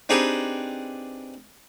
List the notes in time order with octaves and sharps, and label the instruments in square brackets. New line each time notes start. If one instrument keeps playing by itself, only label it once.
[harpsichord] C4 D4 D#4 G4 G#4 B4